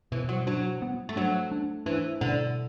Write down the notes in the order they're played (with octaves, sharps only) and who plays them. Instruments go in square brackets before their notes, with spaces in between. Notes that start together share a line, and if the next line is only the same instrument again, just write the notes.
[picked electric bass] B2 [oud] E3
[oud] F#3
[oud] F#3 [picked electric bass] D4
[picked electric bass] B3
[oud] A3
[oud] F#3 [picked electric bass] D4
[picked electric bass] D4
[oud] E3 [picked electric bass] D4
[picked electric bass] B2 [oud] D3